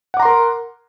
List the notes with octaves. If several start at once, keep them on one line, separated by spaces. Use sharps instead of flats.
A#4 F#5 A#5 C6 D6